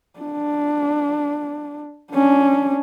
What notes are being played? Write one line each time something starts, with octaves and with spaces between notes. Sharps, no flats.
D4
C#4 D4